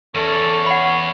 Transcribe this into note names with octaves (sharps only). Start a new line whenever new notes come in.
E2 C#4 A4
C#5 F#5 B5